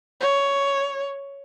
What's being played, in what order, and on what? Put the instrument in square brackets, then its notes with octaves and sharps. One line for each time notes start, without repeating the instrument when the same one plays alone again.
[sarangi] C#5